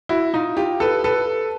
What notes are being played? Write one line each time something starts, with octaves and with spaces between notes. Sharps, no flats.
E4 F#4
D#4 F4
F4 G4
A4 B4
A4 B4